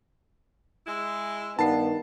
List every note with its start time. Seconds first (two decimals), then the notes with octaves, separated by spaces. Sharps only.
0.87 G#3 E4
1.59 G2 D#3 B3 A5 C7